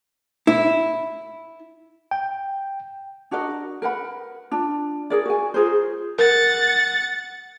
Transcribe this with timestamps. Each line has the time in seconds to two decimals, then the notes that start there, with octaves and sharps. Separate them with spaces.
0.47 E4
2.11 G5
3.31 D4 F#4 A#4 D#5
3.82 A#4 B4 F#5 B5
4.51 D4 F4
5.10 G#4 A#4 D5
5.25 F#4 G#5
5.54 F4 G#4 A#4 C5
6.19 A#4 F#5 A6